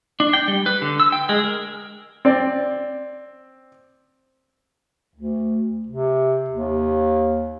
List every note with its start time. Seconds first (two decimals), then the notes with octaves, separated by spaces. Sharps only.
0.20 D4
0.33 G5
0.48 G3
0.66 B4
0.82 D3
1.00 E6
1.12 G5
1.29 G#3
1.44 A#4
2.25 C4 D5
5.15 D2
5.88 C3
6.50 D#2